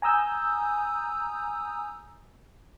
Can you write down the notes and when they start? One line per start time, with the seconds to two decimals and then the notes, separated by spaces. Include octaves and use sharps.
0.02 G#5 A#5 D#6 E6 G6